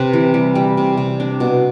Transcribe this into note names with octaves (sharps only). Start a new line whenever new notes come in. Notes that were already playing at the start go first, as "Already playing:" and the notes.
Already playing: C3 B4
E3
G3
G3
C3
C3
D4
B2